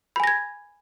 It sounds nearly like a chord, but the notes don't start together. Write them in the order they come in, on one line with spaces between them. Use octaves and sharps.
B5 G#5 A#6 G#6